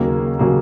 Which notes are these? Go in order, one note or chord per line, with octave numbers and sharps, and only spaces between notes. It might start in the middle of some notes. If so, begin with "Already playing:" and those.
Already playing: D#2 C#3 F#3 A#3
C#3 F#3 A#3